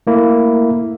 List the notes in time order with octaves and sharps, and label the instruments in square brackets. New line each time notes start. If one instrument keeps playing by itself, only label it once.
[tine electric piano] A3 A#3 E4